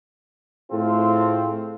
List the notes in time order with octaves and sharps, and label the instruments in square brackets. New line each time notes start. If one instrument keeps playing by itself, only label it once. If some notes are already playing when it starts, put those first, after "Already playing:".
[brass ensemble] A2 A3 C4 F4 G#4 A4